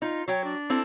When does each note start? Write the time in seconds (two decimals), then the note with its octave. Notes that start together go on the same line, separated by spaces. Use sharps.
0.02 D#4 F4
0.28 F#3 C#5 G5
0.44 D4
0.70 C4 E4 A4